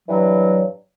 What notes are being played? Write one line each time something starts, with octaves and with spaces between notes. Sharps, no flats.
G2 E3 F#3